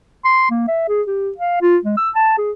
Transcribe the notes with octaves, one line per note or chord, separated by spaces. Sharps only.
C6
A#3
E5
G#4
G4
F5
F4
G#3
E6
A5
G#4